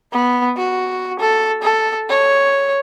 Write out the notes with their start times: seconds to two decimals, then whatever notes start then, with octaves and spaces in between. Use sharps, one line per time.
0.13 B3
0.57 F#4
1.20 A4
1.63 A4
2.10 C#5